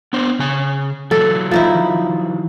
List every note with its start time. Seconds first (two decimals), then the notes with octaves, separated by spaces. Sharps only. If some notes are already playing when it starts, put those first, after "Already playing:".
0.13 B3 D4 C5
0.39 C#3 G#5
1.11 E3 F#3 A4
1.51 F3 D#4 E4